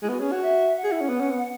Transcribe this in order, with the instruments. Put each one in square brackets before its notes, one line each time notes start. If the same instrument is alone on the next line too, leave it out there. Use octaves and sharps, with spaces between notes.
[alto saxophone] G#3 [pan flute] E4
[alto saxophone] B3 [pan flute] F#4
[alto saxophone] C#4 [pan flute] G#4
[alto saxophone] F#4 [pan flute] C#5
[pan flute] E5
F#5
[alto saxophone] G#4
E4
C#4
B3
C#4
B3